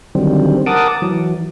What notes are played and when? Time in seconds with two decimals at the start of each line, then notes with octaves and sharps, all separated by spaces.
0.15 D3 D#3 F#3 G3 C4
0.66 A#4 F#5 A5 D6 D#6
1.02 E3 F#3